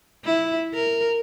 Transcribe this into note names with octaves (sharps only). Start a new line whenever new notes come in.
E4
A#4